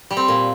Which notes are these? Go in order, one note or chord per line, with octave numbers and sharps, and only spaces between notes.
G3
C4
A#2